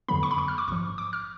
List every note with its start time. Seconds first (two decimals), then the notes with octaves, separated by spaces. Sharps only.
0.08 F2 D3 F#3 B3 B5
0.23 C#6
0.31 B5
0.38 C#6
0.48 F6
0.58 D6
0.68 A1 G#2 F3 C#6
0.98 D6
1.13 F6